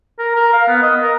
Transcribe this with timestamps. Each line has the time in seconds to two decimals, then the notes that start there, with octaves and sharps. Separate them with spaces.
0.19 A#4
0.36 A#4
0.53 F5
0.68 B3
0.82 D#5
1.02 A#4